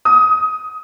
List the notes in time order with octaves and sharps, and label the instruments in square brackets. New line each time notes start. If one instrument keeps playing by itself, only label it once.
[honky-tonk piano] D#6